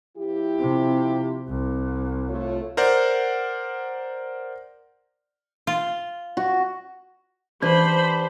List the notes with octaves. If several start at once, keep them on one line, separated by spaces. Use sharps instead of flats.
F3 E4 G4
C3
C2
A3 F4 C#5
A#4 C5 D5 F#5
F4
F#4
E3 D4 G4 B4 C5 B5